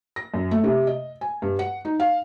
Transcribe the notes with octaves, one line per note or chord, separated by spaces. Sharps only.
A#6
F#2
A3
C3
D#5
G#5
G2
F#5
D#4
F5